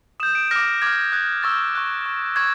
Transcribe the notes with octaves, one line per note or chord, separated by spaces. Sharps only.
D#6 G6 E7
D7
D6 F6 A#6
D6 F6 G#6
D#6 F#6 G#6
C#6 E6 G6 A6
C#6 F#6
C#6 F6
C#6 G#6